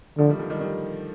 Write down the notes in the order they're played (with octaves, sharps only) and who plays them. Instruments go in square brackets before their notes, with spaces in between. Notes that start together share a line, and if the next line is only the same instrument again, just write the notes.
[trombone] D3 [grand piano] F3 A3
[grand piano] D#3 G3
D3 F3
D#3 G3
D#3 G3